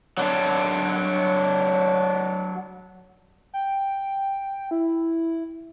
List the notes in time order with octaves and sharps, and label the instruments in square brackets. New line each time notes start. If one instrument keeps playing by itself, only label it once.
[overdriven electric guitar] F#3 D4
[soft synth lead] G5
E4